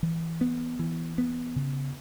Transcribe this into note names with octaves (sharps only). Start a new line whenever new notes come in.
E3
B3
E3
B3
C#3